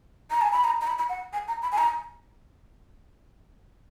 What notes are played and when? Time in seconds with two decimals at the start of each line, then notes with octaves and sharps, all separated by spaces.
0.31 A#5
0.42 G#5
0.52 B5
0.64 A#5
0.81 A#5
0.87 B5
0.98 B5
1.09 F#5
1.33 G#5
1.48 A#5
1.62 B5
1.72 G#5
1.78 A#5